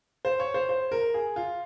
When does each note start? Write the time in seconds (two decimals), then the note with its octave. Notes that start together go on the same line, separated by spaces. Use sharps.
0.25 C5
0.40 C#5
0.54 C5
0.69 C5
0.91 A#4
1.14 G#4
1.36 F4